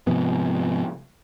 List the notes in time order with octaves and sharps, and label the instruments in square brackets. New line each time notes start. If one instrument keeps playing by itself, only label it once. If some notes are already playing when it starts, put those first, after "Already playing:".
[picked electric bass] G#2 C3 F3 B3